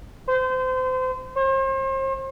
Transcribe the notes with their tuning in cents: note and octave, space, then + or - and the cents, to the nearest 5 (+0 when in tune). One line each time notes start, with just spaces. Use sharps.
C5 -30
C5 +40